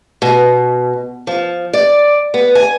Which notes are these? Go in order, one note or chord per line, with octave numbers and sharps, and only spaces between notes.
B2
F3
D5
B3
G#5